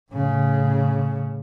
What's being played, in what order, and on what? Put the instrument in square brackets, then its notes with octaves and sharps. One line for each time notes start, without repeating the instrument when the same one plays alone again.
[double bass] A2 C#3